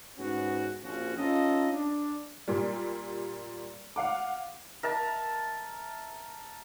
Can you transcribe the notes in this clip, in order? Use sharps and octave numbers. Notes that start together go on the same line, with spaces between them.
G#2 B3 C#4 F#4
A#1 F3 C4 C#4 F#4
C#4 D#4 F4 A4 D#5
D4
A#2 G3
F5 F#5 D6
A#4 E5 A5